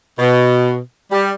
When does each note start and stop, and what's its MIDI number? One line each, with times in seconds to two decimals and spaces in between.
0.19 0.76 47
1.10 1.29 55